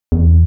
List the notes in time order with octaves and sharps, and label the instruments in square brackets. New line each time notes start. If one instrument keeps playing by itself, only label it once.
[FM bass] E2